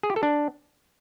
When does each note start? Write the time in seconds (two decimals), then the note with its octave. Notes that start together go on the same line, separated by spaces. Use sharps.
0.03 G#4
0.10 G4
0.16 A4
0.23 D4